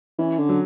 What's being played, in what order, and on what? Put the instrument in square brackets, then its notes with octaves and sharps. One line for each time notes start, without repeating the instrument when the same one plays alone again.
[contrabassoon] E3 [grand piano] C#4
[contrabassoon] D3
[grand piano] F#3